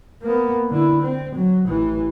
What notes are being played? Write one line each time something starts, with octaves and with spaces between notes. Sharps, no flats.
A#3 B3
D3 E4
C4
F#3
A1 E3